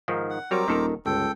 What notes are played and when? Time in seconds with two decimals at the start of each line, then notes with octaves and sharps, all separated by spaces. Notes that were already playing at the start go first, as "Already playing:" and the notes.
0.08 G#2 D#3 F3
0.30 F#5
0.51 F#3 G3 C4 A#4 C#5 A#5 D6
0.68 D#1 D#3 A4 A#4
1.06 G1 C#2 A4 G5